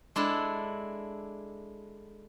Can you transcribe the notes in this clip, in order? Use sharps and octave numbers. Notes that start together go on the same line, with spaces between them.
G#3 D4 E4 A4